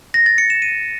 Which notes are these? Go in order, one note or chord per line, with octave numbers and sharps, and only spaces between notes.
A#6
A6
C#7
E7
D#7